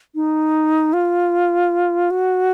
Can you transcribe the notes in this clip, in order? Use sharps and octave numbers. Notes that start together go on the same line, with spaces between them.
D#4
F4
F#4